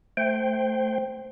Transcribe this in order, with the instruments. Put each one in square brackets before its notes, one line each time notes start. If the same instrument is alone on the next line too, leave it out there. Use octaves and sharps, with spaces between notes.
[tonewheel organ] A3 C5 G5